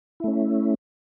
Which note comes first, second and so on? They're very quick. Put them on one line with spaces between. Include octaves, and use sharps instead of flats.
E4 A3 C#4